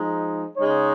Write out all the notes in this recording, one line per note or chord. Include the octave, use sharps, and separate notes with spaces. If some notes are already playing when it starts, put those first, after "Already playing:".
Already playing: F3 G#3 D#4
C#3 G#3 D#4 C#5